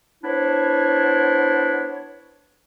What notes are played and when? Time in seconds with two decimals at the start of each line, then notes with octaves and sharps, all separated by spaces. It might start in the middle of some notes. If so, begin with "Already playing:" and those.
0.23 B3 D4 E4 C5 C#5